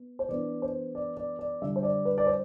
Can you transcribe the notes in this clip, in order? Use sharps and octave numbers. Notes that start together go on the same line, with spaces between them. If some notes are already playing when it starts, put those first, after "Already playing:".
Already playing: B3
C5
E3 B3 D4 D5
C5
D5
D5
D5
D3 G3 D4 E5
C5
D5
B4
D5
C5